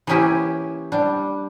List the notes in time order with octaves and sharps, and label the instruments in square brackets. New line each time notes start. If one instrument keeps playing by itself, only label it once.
[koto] E3 A#3 B3 C#4 E4 G4
G3 D4